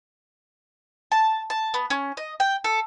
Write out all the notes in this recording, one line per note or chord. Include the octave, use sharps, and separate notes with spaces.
A5
A5
B3
C#4
D#5
G5
A4